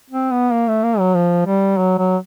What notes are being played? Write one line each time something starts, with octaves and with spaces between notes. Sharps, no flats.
C4
B3
A#3
A3
A#3
F#3
F3
G3
F#3
F#3